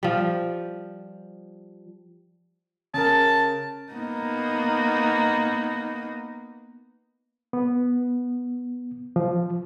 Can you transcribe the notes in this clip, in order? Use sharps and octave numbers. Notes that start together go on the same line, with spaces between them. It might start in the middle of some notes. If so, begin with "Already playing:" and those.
F3 G3
C#3 A#4 A5
A#3 B3 D#4
B3
F3